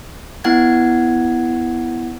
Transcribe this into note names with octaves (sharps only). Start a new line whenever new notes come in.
B3 E4 F#5 G#6